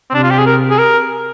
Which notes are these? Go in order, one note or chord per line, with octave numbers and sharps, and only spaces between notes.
C4
C3 D4
F4
G4
G#4
A#4
G#4
A#4